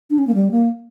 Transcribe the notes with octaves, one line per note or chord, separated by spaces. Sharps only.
D4
C#4
A#3
G3
A#3